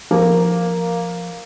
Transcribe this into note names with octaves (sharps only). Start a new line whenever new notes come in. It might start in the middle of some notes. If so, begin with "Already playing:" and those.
F3 A#3